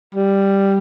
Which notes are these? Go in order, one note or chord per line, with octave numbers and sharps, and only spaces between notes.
G3